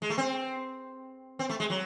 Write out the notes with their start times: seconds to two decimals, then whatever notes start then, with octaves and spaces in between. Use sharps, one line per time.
0.02 G#3
0.10 A3
0.18 C4
1.39 C4
1.49 A3
1.60 G#3
1.70 F#3